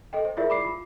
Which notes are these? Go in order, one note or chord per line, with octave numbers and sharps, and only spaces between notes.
A4 D#5 G5
C5
E4 F4 G#4 A#4 D5 E5
B5 D6 C7
F4